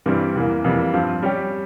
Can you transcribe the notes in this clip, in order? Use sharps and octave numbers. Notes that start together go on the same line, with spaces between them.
G2 E3 G3 C4
E2 E3 A#3
F2 E3 G3 A#3
G2 F3 C4
G3 C#4 G4